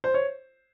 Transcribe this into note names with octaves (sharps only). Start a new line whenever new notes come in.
C5
C#5